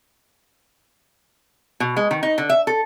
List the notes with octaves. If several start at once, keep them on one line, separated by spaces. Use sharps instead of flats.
B2
G#3
D#3
D#4
D3
E5
A4